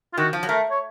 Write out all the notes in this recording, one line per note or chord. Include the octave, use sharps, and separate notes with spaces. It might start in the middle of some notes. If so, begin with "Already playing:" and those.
F4
D#3 F#4
F3
F#3
A3 A#4
C#5